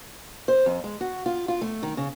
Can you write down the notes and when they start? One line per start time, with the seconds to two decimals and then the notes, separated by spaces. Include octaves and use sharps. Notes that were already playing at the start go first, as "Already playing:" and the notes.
0.48 C5
0.66 F2
0.84 G#3
1.01 F#4
1.26 F4
1.48 F4
1.61 A3
1.83 D#3
1.97 C#3